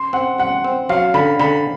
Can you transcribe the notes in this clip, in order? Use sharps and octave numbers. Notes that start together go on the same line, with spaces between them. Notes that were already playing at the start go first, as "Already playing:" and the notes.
Already playing: C6
C4 F#5
G3 F#5
C4
F#3 F5
D3 B5
D3 B5